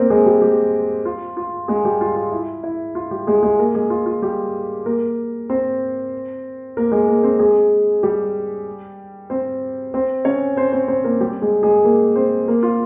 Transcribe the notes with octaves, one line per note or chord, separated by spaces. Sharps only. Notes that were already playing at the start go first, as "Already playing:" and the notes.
Already playing: A#3 C4 A#4 C5
G#3 G#4
G3 G4
G3 G4
F4
F4
G#3 G#4
G3 G4
F4
F4
E4
E4
F4
G3 G4
G#3 G#4
G#3 G#4
A#3 A#4
G#3 G#4
F4
F4
G3 G4
A#3 A#4
C4 C5
A#3 A#4
G#3 G#4
A#3 A#4
C4 C5
G#3 G#4
G3 G4
C4 C5
C4 C5
C#4 C#5
C4 C5
C4 C5
C4 C5
A#3 A#4
G3 G4
G#3 G#4
G#3 G#4
A#3 A#4
C4 C5
A#3 A#4
F4